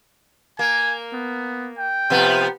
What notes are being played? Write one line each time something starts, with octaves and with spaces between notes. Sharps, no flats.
A#3 G#5
B3
G5
C3 F3 B3